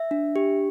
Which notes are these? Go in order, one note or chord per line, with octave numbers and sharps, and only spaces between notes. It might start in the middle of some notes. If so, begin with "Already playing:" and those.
Already playing: E5
D4
G4